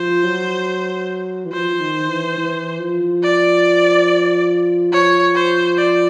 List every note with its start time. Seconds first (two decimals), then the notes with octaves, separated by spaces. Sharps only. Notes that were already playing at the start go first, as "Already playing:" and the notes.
Already playing: F3 C5
0.24 F#3
1.45 E3
1.51 F3 C5
1.80 D#3
2.09 E3
2.37 E3
2.80 F3
3.23 D5
4.92 F3 C#5
5.35 C5
5.77 D5